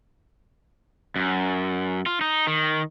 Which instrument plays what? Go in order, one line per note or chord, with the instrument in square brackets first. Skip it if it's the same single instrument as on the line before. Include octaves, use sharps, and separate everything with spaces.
[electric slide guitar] F#2
F4
D#4
D#3